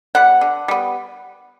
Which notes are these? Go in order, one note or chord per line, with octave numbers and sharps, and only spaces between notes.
G3 B3 F#5
D3
G3 B3